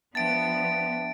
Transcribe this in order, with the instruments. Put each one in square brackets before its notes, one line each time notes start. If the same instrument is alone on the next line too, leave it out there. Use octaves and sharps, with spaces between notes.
[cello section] F3 B3 D4 [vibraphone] E5 G5 A5 [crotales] A6 D7